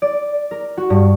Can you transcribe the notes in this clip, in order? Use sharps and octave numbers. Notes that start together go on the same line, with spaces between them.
D5
A#4
F#4
G2